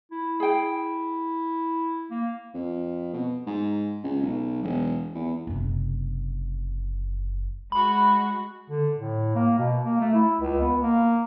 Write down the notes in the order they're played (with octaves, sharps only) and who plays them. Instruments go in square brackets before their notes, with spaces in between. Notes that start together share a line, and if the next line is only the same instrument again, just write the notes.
[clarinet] E4
[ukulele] G#4 G5
[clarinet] A#3
[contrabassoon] F2
B2
G#2
C#2
B1
E1
E2
[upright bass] F#1 C3
[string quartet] G#3 F#4 [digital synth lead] B5
[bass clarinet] D3
A2
A#3
B2
A#3
A3
E4
C#2
B3
A#3